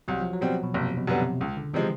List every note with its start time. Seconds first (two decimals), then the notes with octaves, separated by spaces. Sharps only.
0.08 C2 F#3
0.20 F3
0.33 F#3
0.41 B2 G3 C4
0.63 B2
0.74 F#1 C3
0.97 B2
1.07 F#2 D3 G3 B3
1.19 C3
1.41 C#2 C#3
1.57 D3
1.74 C3 E3 F3 G#3